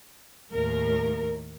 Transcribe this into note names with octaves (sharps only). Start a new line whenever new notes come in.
D#2 A2 A#4